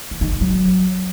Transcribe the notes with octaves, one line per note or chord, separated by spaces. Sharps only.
E3
D#3
G2
F#3